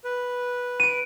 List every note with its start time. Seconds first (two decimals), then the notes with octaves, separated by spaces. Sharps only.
0.05 B4
0.80 D7 D#7